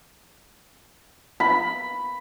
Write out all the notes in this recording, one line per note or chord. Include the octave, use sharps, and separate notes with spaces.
B5